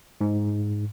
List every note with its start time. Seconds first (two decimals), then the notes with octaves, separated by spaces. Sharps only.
0.21 G#2